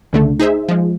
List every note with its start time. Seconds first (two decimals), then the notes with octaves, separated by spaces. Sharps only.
0.13 C#2 D3 A3
0.40 D#4 G#4 C5 E5
0.68 F3 G#3